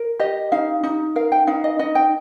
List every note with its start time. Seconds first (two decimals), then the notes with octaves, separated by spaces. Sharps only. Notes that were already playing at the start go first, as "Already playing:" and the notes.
Already playing: A#4
0.20 G4 D#5
0.52 D#4 F5
0.83 D#4
1.16 A#4 F5
1.32 G5
1.47 D#4 F5
1.64 D#5
1.79 D#4 D#5
1.95 G5